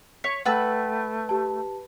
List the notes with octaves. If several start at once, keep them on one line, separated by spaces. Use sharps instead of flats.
C#5 B6
A3 B4 F#5 G5 B5 E6 A6
G4 A5